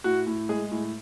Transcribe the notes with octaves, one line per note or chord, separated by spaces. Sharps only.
A2 F#4
A2
G#3 G#4
A2